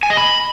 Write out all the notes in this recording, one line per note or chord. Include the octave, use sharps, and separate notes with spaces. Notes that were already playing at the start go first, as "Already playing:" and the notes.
G#5
D#5
B5